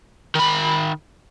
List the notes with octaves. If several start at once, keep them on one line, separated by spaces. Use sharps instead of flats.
D#3 B5